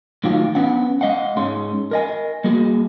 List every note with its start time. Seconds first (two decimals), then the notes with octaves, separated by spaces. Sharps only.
0.24 A2 D#3 F#3 F4 G4
0.55 B3 C#4 D4 F#5
1.01 G#3 D#5 F5 F#5
1.37 G#2 G#3 C#4 C6
1.91 A#4 D#5 G#5
2.44 G3 A#3 F#4 G#4